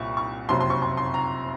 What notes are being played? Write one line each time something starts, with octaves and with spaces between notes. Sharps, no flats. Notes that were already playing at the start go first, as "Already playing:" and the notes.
Already playing: C2 A#2 C#6
C#6
F#1 F2 C3 F#3 C6
C6
C#6
C6
C6
A#5